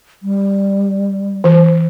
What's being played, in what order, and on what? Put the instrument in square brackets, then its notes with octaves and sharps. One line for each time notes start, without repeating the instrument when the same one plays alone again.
[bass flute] G3
[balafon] E3 C5